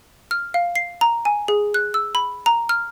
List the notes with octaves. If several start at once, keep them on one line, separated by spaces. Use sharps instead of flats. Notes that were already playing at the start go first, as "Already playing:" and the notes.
F6
F5
C7
A#5
G#5
G#4
F#6
E6
B5
A#5
F6